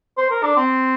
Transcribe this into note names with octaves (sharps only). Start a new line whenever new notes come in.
C5
A#4
D4
C4